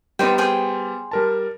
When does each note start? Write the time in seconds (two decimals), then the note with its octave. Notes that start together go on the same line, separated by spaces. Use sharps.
0.19 G3 B3 D#4 C5 G5
0.38 G#4 C5 G5
1.11 G3 A#4 A5